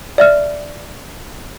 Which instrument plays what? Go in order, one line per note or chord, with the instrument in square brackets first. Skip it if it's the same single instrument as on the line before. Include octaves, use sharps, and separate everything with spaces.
[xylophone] D5 E5 F6